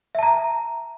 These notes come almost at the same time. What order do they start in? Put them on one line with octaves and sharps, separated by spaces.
E5 A5 A#5